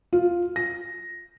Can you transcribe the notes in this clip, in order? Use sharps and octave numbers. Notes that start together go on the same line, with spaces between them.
F4
A#6